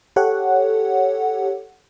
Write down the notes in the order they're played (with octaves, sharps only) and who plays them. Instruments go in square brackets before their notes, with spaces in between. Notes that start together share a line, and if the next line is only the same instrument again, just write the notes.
[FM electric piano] G4 A4 C#5 F#5